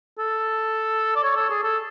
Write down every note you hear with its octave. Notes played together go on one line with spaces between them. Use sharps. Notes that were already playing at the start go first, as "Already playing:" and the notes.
A4
D5
C#5
A4
G#4
A4